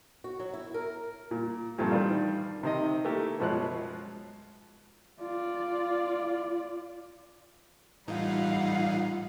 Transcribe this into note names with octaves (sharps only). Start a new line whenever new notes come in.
F#4
F#3
E4
A#4
A#2
G2 A#2 F3 A3 C4
D#3 E3 G3 D4 F4
C3 D#3 D#5
A3 A#3 E4 G4
F#2 B2 F3 G#3 C#5 F#6
F4 D5
A2 E3 G3 D#4 F4 F5 F#5